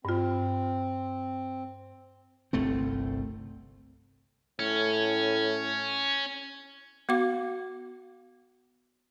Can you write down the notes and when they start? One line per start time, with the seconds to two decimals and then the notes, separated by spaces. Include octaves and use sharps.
0.05 G2 C4 F4
2.53 G1 C2 A3 C4
4.59 A2 C#4
7.09 B3 F#4 F5 D6